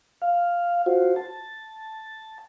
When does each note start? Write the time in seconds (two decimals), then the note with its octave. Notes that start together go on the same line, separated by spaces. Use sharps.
0.22 F5
0.86 F4 F#4 C5
1.16 A5